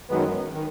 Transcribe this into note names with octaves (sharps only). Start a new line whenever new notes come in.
F#2 D#3 F#3 G#3 B3
D#3